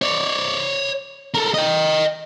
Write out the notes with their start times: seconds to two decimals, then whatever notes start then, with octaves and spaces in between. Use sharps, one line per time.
0.02 C#5 D5
1.34 A4 A#4
1.54 D#5 G5